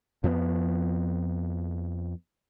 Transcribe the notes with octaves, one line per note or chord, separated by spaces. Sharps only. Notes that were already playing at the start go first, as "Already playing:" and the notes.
F2 F3 A3 B3